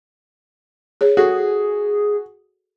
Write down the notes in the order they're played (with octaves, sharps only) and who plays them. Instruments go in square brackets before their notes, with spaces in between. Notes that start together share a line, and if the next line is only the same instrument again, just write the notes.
[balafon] G#4 C#5
[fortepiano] F#4 [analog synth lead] G#4 [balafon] A4